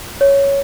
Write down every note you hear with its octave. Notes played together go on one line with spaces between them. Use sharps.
C#5